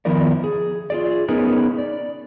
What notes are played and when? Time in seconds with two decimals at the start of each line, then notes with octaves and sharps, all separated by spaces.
0.05 D#3 F3 B3 E4 A#4 D5
0.44 G#4
0.90 F4 G#4 D5
1.28 B3 C#4 D#4 G#4 A#4 B4
1.78 D5